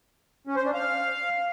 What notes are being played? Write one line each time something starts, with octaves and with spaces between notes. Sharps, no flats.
C#4
C5
D4
F5